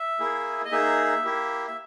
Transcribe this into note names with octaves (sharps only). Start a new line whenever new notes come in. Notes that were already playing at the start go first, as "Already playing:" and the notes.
Already playing: E5
A#3 E4 G#4
D#5
A#3 D#4 G#4 E5
A#3 E4 G4
E5